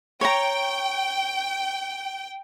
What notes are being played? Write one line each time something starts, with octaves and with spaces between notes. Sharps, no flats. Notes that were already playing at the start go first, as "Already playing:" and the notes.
C#5 G5 A#5